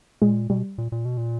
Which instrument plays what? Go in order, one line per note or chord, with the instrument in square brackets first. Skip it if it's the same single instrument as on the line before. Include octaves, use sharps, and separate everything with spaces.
[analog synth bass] A#2 [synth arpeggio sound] G#3
[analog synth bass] B2 [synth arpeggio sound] G3
[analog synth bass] A#2
A#2
B2
A#2